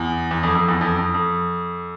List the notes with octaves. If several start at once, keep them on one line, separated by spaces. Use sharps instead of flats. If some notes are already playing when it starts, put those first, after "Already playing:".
Already playing: E2
E2
F2
F2
E2
F2
F2
F2